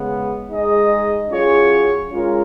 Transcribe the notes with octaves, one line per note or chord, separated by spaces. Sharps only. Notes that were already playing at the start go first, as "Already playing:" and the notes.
Already playing: C#3 G#3 B3
G#3 D#4 G#4 D#5
F#3 C#4 F4 G#4 C#5
G#3 C#4 F4 A#4